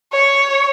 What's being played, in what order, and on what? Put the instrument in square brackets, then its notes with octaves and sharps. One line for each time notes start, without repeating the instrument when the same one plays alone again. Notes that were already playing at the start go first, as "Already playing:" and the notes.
[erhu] C#5